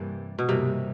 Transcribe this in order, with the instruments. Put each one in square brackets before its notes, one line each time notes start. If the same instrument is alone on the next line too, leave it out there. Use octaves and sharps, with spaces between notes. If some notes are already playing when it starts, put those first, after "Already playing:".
Already playing: [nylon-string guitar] G2 E3 G3 A#3 [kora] C3
[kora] B2
[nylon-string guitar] G2 E3 G3 A#3 [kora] C3